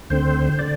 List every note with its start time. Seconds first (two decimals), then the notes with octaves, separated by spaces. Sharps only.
0.10 D2 D3 C4 C5
0.59 D3 D5